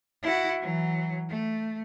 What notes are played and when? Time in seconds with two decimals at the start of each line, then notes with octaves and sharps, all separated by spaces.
0.23 E4 F#4
0.60 E3 F#3
1.29 A3